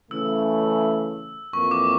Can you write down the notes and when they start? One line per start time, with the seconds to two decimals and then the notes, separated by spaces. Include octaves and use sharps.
0.11 C#3 E3 A3 E6
1.53 F2 E3 A#3 C#6
1.71 D6